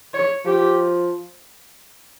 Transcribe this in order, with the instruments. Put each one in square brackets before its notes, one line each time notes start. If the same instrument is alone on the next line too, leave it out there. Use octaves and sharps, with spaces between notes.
[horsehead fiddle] C#5
[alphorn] F3 [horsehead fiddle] G4